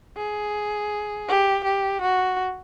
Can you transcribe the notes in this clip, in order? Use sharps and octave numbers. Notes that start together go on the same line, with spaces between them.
G#4
G4
G4
F#4